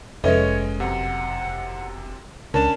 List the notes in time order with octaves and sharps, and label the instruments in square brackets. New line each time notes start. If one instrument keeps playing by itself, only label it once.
[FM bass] F1 [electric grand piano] G#3 C#4 D#5 [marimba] A4 B4 E5 [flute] C#5
[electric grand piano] F#2 C3 [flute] F#5
[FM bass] C#2 [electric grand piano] C#4 D4 [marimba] A#4 [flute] A5